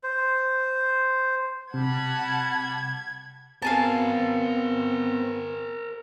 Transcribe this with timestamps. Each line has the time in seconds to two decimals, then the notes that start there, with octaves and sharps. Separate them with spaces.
0.04 C5
1.74 C3 G3 F#5 A5 B5 G#6
3.62 B3 C4 G#4 A#4 F5 G#5 A5